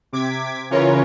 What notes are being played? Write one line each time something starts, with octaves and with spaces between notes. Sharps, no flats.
C3 D6 G#6 B6
C#3 E3 C#4 F4 A#4 C#5